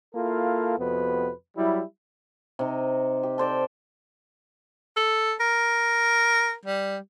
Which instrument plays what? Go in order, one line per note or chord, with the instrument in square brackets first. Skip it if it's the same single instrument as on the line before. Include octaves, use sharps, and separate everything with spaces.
[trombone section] A#3 E4 F4 A4
F2 C3 B3 F#4 B4
F#3 G3 E4
[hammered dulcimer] C3 D#4
G4
A4 C5 D5 G5
[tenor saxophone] A4
A#4
G3